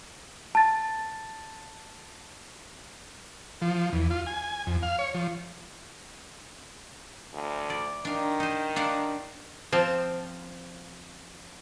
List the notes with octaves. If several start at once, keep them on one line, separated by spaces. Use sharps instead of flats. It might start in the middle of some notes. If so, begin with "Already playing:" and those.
A5 A6
F3
E2
F4
G#5
F2
F5
C#5
F3
D2
D5
D#3 D4 F5
D#4 C5
D4 F5 F#5
F3 C4 A5